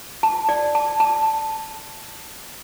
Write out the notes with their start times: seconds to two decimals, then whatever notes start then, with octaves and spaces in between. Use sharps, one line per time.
0.23 A5
0.49 D5
0.75 A5
1.00 A5